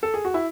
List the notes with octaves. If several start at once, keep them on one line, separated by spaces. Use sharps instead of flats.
A4
G#4
F#4
E4